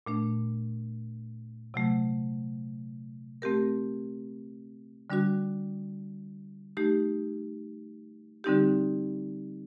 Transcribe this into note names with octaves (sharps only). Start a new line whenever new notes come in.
A#2 A3 D4
C3 F#3 A3
A3 C4 G4 A#4
D3 G3 D4 F#4
A3 D#4 G4
D3 G3 C4 D#4 G4